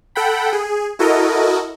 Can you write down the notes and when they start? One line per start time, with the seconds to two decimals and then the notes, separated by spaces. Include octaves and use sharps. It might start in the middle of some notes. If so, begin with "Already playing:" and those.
0.15 A4 F#5 G5 B5
0.53 G#4
0.99 E4 F#4 A4 A#4 D#5